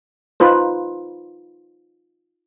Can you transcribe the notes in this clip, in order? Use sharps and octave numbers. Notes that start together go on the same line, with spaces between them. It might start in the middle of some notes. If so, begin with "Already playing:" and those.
D#4 F4 B4 C5